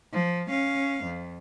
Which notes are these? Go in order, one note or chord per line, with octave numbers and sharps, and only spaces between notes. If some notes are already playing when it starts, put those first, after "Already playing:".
F3
C#4 F5
F2